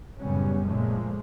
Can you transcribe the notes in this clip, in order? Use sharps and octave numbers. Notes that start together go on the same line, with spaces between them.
F#2 A2 C#3 G3 B3 C#4
A#2 F3 G#3 A3